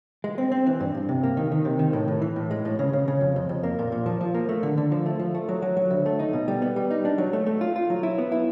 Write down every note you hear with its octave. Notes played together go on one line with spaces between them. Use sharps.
G#3
C4
C4
E3
G2
G2
C3
A#3
D#3
D#3
C3
D#3
A2
A2
E3
A2
G#3
A2
C#3
C#3
C#3
F2
F2
F2
A#3
A#2
A#2
F3
F3
A#3
A3
D3
D3
F3
A3
F3
A3
F#3
F#3
F#3
D2
A3
D#4
B2
G3
B3
G3
D#4
D4
F#3
A3
A3
F4
F4
F#3
E4
B3
E4